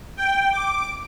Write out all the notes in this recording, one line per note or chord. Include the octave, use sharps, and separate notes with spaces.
G5
D6